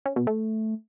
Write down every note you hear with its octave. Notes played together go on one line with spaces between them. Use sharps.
C#4
B2
A3